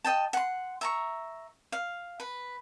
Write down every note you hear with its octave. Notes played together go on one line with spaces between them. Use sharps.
D#5 G5 A5
F#5 C6
E5 A#5 C#6
F5
B4